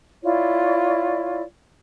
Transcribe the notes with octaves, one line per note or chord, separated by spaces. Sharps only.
E4 F4 C#5 D5